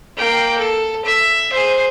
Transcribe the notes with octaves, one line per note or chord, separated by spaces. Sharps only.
A#3 G5
A4
E5
G#4 C5